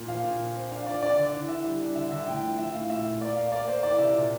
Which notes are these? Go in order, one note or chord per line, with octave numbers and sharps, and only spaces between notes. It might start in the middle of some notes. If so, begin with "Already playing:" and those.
Already playing: A#2
F3 F5
A#2
F3
C4
D4 F5
F3 D5
D4 D5
D3 D5
E3
E3 E5
G3
D4
D3 E5
D3 E5
A2 G5
F3
F3 E5
A2 F5
A#2 E5
A#2
A#3 D5
A#3 F5
A#3 D5
A#3 C5
E3 D5
C3 E5
A#2